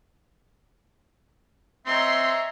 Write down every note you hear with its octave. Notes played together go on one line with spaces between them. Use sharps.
C4 C#5 D#5 E5 A#5 C6